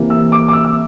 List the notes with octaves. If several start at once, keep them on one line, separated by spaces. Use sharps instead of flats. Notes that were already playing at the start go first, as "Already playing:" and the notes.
Already playing: C3 E3 A#3
E6
D6
D6
E6
E6